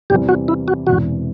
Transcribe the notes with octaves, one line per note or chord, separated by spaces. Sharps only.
E2 C3 E3 G3 C4 G4
F#4
E4
F#4
E1 E2 C3 E3 F#4